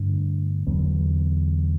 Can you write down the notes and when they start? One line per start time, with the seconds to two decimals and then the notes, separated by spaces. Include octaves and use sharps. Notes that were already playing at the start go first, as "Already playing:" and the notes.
Already playing: G2 D3 A3 D4
0.67 E2 D3 F#3 B3